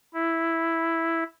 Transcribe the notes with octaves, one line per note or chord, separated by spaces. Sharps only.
E4